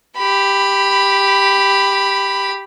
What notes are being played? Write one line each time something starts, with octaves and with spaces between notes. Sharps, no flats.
G4 B5